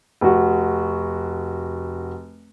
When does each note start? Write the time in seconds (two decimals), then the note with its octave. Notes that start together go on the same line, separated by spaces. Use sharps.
0.21 F1 F#4